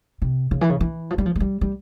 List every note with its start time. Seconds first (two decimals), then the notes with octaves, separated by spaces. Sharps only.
0.22 C3
0.51 C#3
0.61 E3
0.70 C#3
0.81 E3
1.10 F3
1.18 G3
1.26 F3
1.36 G#3
1.40 G3
1.61 G3